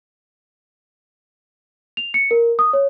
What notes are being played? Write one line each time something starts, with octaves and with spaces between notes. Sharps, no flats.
F7
C#7
A#4
D#6
C#5